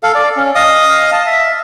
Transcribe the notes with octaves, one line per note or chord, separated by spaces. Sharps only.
A4 F5
D5
C#4
D#5 F5 D#6
A5
E5